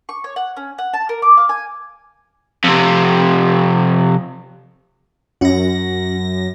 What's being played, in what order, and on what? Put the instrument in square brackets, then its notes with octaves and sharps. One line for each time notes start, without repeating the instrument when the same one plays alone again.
[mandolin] C#6
C#5
F#5
C#4
F#5
A5
A#4
D6
F5
G#5
[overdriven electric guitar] F2 C3
[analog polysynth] F#2 A#6 [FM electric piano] C#4 F#4